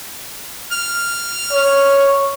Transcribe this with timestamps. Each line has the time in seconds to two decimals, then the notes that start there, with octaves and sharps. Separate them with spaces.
0.72 F6
1.53 C#5